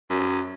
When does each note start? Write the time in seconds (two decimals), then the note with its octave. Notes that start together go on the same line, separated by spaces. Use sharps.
0.10 F#2